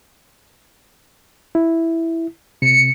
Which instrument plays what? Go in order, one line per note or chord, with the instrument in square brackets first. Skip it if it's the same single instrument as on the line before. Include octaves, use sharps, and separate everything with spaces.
[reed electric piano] E4
[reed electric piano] C3 [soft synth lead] C#7